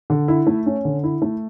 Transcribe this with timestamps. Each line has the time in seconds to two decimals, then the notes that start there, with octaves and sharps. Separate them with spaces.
0.10 D3
0.28 E4
0.47 A3
0.66 C#4
0.85 D3
1.04 E4
1.22 A3